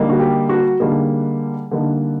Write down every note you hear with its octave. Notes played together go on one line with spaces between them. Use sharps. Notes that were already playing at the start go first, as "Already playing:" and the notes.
Already playing: D3 G3 A#3 D#4
F#4
G4
F#4
D3 G3 A#3 D#4 G#4
D3 G3 A#3 D#4